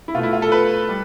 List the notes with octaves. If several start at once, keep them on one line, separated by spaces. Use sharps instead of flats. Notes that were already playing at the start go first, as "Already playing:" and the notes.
E4
B2 A3 F4
E4
F4
A4
B4
G3